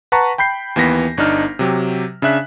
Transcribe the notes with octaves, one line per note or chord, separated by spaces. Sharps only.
B4 F#5 A5 A#5 C#6
G5 B5 G6 C7
D#2 E3 B3 A#6 B6
G1 D4 D#4 F6
C3 F#3 G4
C#3 D4 E5 F#6 B6